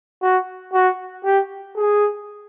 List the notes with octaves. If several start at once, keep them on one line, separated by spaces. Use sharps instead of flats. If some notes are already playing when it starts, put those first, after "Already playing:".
F#4
F#4
G4
G#4